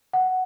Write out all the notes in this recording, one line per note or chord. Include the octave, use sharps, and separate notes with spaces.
F#5